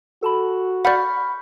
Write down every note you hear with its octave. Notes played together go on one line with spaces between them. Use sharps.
F#4 A4 A5 B5
D5 F#5 B5 C#6 F6 G6 B6